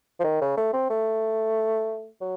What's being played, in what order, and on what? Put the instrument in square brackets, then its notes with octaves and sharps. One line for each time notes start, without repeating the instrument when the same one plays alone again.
[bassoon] F3
D#3
C#3
A3
C4
A3
F#3